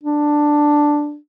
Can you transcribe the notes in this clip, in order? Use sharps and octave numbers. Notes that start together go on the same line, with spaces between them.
D4